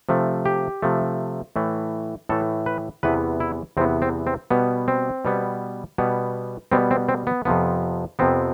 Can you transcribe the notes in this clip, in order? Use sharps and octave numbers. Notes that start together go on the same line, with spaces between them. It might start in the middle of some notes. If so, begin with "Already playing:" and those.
C3 F3 A3
G4
C3 F3 A3
A2 E3 A3
A2 E3 A3 A4
B4
E2 C3 E3 B3 B4
E4
E2 C3 E3 B3 C4
C4
C4
B2 G3 B3
C4
B2 G3 B3
B2 G3 B3
B2 G3 B3 C4
C4
C4
B3
F2 C3 F3 B3
F2 C3 F3 B3 C4